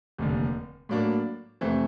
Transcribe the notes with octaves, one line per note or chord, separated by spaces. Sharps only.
F1 D#2 D3
A2 F#3 A#3 D4
F2 C3 E3 A3 C4